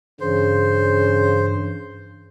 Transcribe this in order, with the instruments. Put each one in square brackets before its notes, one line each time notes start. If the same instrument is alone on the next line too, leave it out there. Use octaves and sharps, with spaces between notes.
[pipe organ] G2 E3 [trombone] C#3 [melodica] C5